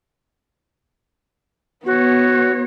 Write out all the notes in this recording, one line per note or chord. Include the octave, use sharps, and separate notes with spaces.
B3 F#4 C#5